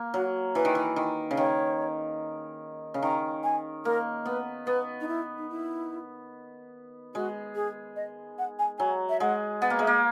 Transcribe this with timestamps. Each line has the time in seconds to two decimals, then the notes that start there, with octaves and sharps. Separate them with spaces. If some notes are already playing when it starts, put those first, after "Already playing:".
Already playing: A#3
0.14 F#3 F#4
0.55 E3 B4
0.65 D#3
0.75 E3
0.96 D#3
1.31 C#3
1.37 D#3 C#5
2.94 C#3
3.02 D#3 A#5
3.44 G#5
3.85 A#3 A#4
4.26 B3 B4
4.67 B3 B4
5.01 D#4
5.08 E4
5.38 D#4
5.49 E4
7.14 G#3 F#4
7.56 G#4
7.96 D#5
8.38 F#5
8.59 G#5
8.79 F#3 G#5
9.09 E5
9.20 G#3 F#5
9.61 B3 F#5
9.70 A#3
9.79 G#3 E5
9.87 A#3